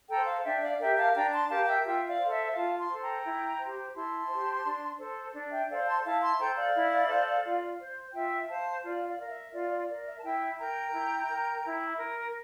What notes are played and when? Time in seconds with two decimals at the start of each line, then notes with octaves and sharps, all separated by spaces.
0.09 A4 G5 A#5
0.15 C5
0.27 F5 A5
0.44 D4 E5 G5
0.62 D5 F5
0.72 F5
0.79 G4 A#4 E5 G5
0.97 F5 A5
1.15 D4 G5 A#5
1.31 A5 C6
1.49 G4 A#4 F5 A5
1.67 E5 G5
1.84 F4 E5 G5
2.08 D5 F5
2.19 A4 C5
2.31 E5
2.54 F4 F5 A5
2.77 A5 C6
2.89 A4 C5
3.00 G5 A#5
3.25 E4
3.60 G4 C5
3.95 E4 A5 C6
4.29 G4 C5
4.64 D4
4.99 A4 C5
5.34 D4
5.51 E5 G5
5.69 A4 C5 D5 F5
5.86 A5 C6
6.04 E4 F5 A5
6.22 A5 C6
6.39 A4 C5 G5 A#5
6.56 D5 F5
6.75 E4
7.09 A4 C5
7.44 F4
7.79 C5
8.14 F4 E5 G5
8.49 C5 F5 A5
8.83 F4 D5 F5
9.07 D5 F5
9.19 A#4 F5
9.30 E5
9.53 F4 D5
9.72 D5
9.89 A#4 D5
10.07 E5
10.17 A5
10.23 E4 E5 G5
10.59 A#4 G5 A#5
10.94 E4
11.29 A#4
11.64 E4
11.99 A#4